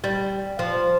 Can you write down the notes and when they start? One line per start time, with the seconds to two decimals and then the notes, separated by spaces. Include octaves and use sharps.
0.04 G3
0.59 F3